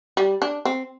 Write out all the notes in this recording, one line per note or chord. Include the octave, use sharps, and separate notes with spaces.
G3
D4
C4